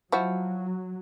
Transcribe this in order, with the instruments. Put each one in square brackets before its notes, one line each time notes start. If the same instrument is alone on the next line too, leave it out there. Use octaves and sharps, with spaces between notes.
[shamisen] F3 E4 F#4 [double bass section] F#3